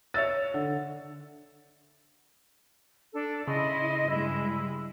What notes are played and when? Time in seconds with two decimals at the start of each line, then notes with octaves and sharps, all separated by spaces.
0.14 C#5 E5 E6 A6
0.54 D3
3.13 D4 A4
3.48 C#3 E4 D#5 C6
4.09 G2 G#3 E4